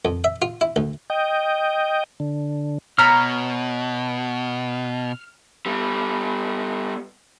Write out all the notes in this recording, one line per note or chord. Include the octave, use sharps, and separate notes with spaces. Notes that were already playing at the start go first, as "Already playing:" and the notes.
F2
E5
F4
E4
D2
D#5 G5
D3
B2 C#5 A#5 B5 F6
G3 B3